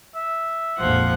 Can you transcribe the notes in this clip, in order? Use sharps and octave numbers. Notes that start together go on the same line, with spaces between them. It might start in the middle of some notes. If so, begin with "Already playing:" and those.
E5
A#1 F2 G#2 F3 F#5